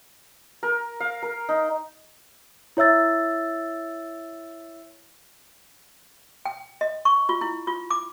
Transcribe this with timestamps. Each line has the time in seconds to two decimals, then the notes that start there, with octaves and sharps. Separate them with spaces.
0.63 A#4
1.00 F5
1.23 A#4
1.49 D#4
2.77 E4 C#5 E5 E6 A6
6.46 G5
6.81 D#5
7.05 C#6
7.29 F4
7.41 E4
7.67 F4
7.90 D6